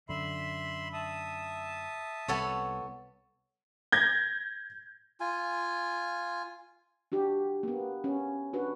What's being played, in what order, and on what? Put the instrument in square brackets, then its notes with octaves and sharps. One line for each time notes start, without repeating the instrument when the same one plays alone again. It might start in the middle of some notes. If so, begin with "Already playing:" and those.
[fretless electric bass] F#2 D3 [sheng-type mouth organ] E5 B5 C6
[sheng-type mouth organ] E5 A5 D#6
[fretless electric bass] C2 [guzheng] B3 A4 C#5
[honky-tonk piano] G6 G#6 A#6
[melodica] F4 G#5
[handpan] D4 F#4 G4
A#3 B3
C#4
D4 F#4 B4